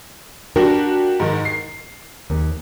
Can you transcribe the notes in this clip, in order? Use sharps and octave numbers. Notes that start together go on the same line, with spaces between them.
D4 F#4 G4 A#4
G#2 D#3
C7
D#2